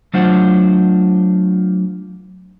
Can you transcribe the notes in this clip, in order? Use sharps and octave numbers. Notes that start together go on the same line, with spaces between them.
F#3 A3 D4 F4 C5 F#5